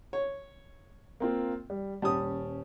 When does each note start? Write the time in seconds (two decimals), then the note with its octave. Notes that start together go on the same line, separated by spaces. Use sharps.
0.13 C#5
1.20 A#3 C4 F4
1.70 G3
2.02 D#1 G3 C#4 A5 D#6